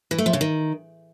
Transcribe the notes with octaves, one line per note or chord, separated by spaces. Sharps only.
E3
A3
F3
C#3
D#3